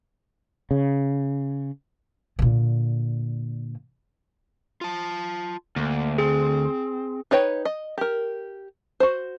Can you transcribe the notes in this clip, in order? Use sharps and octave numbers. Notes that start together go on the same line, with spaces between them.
C#3
A#2 D3
F4 A5
D2 A#3
C4 G#4
D#4 B4 C#5 G5
D#5
G4 A#4
F#4 C5